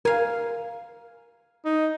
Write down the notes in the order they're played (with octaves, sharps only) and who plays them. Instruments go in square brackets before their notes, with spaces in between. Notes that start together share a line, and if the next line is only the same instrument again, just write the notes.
[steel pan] A#4 [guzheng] F5 G#5
[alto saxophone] D#4